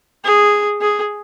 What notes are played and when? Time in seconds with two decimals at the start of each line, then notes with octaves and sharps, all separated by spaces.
0.24 G#4
0.81 G#4